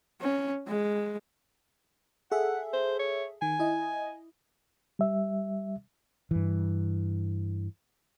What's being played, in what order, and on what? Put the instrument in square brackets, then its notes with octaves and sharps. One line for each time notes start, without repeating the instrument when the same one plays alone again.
[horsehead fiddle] C#4
G#3
[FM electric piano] G#4 A4 E5 [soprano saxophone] F#5
[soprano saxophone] C5
C#5
[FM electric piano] D#3 [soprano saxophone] G#5
[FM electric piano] E4 D#5
[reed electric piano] G3 E5
[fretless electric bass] G2 E3